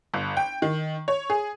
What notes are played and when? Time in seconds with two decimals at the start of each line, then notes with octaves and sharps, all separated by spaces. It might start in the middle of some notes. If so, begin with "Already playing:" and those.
0.14 G1
0.37 G5
0.62 D#3
1.08 C#5
1.30 G#4